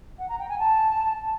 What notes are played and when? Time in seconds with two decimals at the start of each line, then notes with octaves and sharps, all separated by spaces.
0.19 F#5
0.29 A#5
0.39 G5
0.49 G#5
0.59 A5